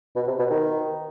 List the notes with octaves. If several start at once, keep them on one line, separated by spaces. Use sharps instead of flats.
B2
C3
B2
D#3